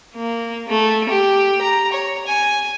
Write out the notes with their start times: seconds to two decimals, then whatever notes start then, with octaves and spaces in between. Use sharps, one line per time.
0.15 A#3
0.68 A3
1.09 G4
1.61 A#5
1.92 C#5
2.26 G#5